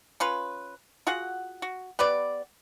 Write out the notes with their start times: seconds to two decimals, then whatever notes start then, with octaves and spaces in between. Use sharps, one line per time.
0.20 C#4 F4 B4
1.07 F4 F#4 G#4 F#5
1.62 F#4
1.99 B3 G4 B4 D5